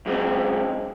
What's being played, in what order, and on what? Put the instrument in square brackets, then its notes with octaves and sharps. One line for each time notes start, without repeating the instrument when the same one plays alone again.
[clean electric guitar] F#2 G#3 C4